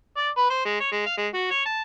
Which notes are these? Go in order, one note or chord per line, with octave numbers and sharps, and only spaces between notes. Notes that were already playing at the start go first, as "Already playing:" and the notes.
D5
B4
C5
G#3
C#5
G#3
F5
G#3
F#4
C#5
A5